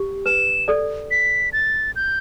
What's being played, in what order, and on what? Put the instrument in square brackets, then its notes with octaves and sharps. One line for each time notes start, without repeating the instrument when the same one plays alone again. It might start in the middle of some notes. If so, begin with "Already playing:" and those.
Already playing: [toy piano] G4
[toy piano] B4 [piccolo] E7
[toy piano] A4 D5
[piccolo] B6
A6
G6